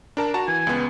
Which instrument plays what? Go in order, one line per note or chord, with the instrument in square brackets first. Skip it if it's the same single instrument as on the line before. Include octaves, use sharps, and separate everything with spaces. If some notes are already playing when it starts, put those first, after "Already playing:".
[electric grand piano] D4 A#4 A5
F#4 A5 A#5
[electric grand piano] E3 [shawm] G#5
[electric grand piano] C#2 B3